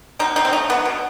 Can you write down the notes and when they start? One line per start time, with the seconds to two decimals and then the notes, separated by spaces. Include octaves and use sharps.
0.19 B2 D#4
0.36 B2 D#4
0.45 C4
0.53 A3 D#4
0.69 F#3 B3
0.85 B2